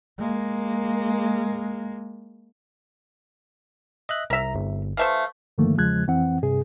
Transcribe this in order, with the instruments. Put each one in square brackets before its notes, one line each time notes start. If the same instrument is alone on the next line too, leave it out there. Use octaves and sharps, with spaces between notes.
[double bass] G#3 A#3
[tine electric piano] D#5 E5 F#6
[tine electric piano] C2 A#5 [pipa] A#4 E5
[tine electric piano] G1
[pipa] E3 A3 C5 [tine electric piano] F5
[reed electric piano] G2 D3 D#3 F3 A3 A#3
E2 C#3 F3 G#3 F#6 G#6
F2 E3 C4 F#5
G2 C3 G#4